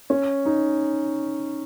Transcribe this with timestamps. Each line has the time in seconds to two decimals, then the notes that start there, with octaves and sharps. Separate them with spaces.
0.10 C#4
0.46 D#4